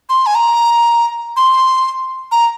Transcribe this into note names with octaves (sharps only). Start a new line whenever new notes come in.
C6
G#5
A#5
C6
A#5